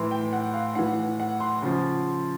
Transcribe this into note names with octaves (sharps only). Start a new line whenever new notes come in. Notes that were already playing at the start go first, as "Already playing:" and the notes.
Already playing: A2 E3 C6
G5
F#5
F5
A2 E3 F#5
F#5
C6
C#3 F3